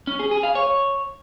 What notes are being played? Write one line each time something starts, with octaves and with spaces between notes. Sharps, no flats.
C#4
G#4
G#4
F5
C#5